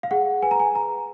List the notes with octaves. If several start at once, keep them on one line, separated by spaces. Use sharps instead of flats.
F5
G#4 F#5
B4 G#5
A#5
G#5
B4 A#5